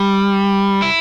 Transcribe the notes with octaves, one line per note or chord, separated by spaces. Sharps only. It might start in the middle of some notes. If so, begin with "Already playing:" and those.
Already playing: G3
E4